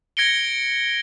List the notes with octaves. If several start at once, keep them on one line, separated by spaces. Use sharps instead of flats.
G#6 A#6 C#7 D7 G7